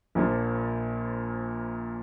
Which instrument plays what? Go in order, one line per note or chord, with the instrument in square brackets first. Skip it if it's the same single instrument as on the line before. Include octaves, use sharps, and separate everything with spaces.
[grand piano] A#1 A#2 F3